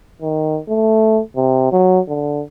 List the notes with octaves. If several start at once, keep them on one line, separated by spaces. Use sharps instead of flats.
D#3
A3
C3
F#3
D3